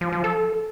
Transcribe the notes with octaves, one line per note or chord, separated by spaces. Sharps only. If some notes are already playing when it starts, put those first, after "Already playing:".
F3
F3
A4